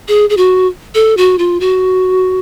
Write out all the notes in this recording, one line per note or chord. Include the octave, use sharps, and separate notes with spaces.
G#4
G#4
F#4
A4
F#4
F4
F#4